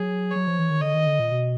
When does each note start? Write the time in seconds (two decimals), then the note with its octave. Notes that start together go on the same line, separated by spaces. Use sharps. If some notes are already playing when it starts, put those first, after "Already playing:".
Already playing: F#3 G#4
0.31 F#3 C#5
0.47 F3
0.59 E3
0.70 D#3
0.81 D3 D#5
0.94 D#3
1.06 D3
1.19 A#2
1.32 B2